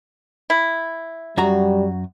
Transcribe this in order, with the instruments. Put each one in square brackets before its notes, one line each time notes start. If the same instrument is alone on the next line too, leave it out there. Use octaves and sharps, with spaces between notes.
[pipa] E4
[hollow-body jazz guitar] F#2 F#4 A#5 [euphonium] G3